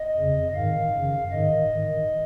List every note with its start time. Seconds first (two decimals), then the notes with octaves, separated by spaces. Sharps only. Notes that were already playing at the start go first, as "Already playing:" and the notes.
Already playing: D#5
0.17 F2 C#3
0.55 G#2 D#3 F5
0.94 F#2 C#3
1.32 G#2 D#3 D#5
1.70 G#2 D#3